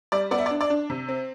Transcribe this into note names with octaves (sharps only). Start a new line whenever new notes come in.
G3 D5
B3 D5
E5
D5
D4
D5
D4
C3
C4